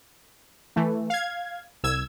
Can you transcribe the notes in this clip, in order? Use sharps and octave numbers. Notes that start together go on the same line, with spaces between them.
E3 A3
F5 G#6
C2 E6 G#6